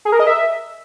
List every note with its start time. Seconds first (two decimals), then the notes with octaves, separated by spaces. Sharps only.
0.05 G#4
0.12 A#4
0.20 D#5
0.27 E5